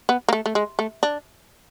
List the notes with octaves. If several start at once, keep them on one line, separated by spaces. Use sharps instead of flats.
B3
A#3
A3
A3
G#3
A3
D4